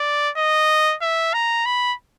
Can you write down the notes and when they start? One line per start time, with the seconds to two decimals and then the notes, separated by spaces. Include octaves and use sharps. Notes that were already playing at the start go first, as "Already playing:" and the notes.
Already playing: D5
0.37 D#5
1.02 E5
1.34 A#5
1.66 B5